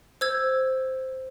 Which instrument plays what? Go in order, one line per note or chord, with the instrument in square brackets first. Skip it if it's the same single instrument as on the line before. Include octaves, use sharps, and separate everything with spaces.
[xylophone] C5 E6 G#6